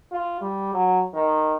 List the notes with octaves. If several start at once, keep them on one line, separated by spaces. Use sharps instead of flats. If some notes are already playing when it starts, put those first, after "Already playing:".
F4
G3
F#3
D#3